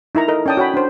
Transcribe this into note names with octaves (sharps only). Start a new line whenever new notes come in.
D#4 E4 A#4 A#5
A4 A#4 D#5
C#4 D5 G5 A5 D#6
F#4 C#5 G5 B5
D4 C5